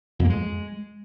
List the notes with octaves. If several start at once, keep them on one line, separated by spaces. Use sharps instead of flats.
F2
A#3
G#3